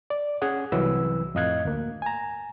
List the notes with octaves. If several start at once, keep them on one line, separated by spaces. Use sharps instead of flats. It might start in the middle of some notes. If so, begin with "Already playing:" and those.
D5
C#4 G#4 F#5 G#5
C2 E3 F#3 B4 E6
F2 A2 D#5 F5 F#6 G#6
D2 A#3
G#5 A#5